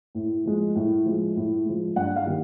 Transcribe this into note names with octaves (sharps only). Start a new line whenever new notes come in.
A2
F3 G#3
A2
F3 G#3
A2
F3 G#3
G2 F#5
F5
D#3 G3